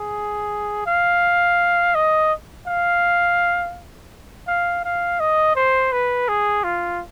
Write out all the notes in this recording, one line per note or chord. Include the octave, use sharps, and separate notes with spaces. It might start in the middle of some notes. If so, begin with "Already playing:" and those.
Already playing: G#4
F5
D#5
F5
F5
F5
D#5
C5
B4
G#4
F4